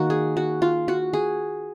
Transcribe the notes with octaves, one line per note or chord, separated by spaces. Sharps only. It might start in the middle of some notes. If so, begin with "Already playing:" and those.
Already playing: D#3 A#3 F#4
G#4
F#4
F4
F#4
G#4